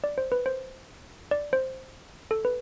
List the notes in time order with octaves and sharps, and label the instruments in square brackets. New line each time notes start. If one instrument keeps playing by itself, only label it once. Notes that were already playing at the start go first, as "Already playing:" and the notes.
[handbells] D5
C5
B4
C5
D5
C5
A4
B4